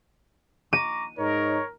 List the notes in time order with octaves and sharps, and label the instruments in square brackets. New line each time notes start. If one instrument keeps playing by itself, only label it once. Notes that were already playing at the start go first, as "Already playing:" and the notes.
[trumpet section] A#5 C#6 D6 [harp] D#7
[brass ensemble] G#2 D#4 [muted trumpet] A#4 [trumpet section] C#5